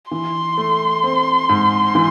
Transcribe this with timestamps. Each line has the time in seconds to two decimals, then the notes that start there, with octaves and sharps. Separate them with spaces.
0.11 E3 C6
0.57 A3
1.04 C4
1.49 G#2
1.95 E3